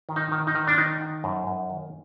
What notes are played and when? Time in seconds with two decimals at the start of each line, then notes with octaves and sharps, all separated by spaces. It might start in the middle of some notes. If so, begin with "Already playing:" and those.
0.09 D#3
0.16 D#4
0.32 D#3
0.47 D#4
0.55 D#3
0.67 D4
0.78 D#3 D#4
1.01 D#3
1.24 F#2
1.47 F#2
1.70 D#3